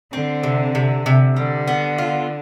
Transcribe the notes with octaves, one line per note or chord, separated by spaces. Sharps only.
D3 C4
C3
C3
C3
D3 G3
B3
F4